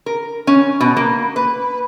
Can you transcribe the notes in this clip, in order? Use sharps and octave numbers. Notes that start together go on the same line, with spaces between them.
A#4
C#4
B2
A#3
B4